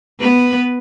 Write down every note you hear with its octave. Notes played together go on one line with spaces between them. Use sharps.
B3 B4